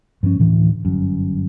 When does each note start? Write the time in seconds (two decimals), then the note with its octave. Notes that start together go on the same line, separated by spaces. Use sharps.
0.23 G2 F3 G3 C#4
0.38 D2 A2 E3
0.85 G1 F#2